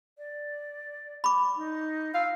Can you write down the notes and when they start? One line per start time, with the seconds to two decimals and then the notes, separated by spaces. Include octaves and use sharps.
0.18 D5
1.24 B5 D6
1.57 D#4
2.14 F5 E6